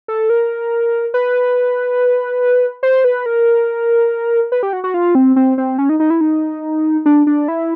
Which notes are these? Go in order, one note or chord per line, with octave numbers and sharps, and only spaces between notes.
A4
A#4
B4
C5
B4
A#4
B4
G4
F#4
F#4
F4
C4
C4
C4
C#4
D#4
D#4
E4
D#4
D4
D4
E4